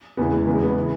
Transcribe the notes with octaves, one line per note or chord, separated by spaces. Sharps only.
E2 C#3 E3 B3
G#3
E2 C#3 E3 B3
G#3
B3
C#3 E3